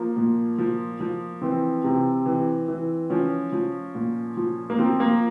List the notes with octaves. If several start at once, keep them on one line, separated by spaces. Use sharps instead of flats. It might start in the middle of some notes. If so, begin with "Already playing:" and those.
Already playing: F3 A#3
A#2
F3
F3
E3 C4
C3
E3
E3
F3 C#4
F3
A#2
F3
A#3
F3 C4
A#3